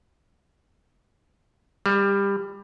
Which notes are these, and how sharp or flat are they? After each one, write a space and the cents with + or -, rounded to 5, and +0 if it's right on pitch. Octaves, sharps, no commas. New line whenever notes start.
G3 +20